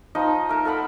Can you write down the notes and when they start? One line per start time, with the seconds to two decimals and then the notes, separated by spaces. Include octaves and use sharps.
0.15 F3 D#4 D#5
0.49 A3 A#4 A5
0.65 A4 F5 F#5 B5